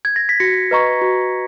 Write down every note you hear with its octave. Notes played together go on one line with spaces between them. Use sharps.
G#6
A#6
B6
F#4 A#6 C#7
B4 D#5 A#5 C#6
F#4